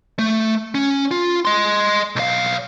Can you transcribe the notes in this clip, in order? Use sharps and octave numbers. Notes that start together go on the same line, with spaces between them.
A3
C#4
F4
D#5 C6
B1 F5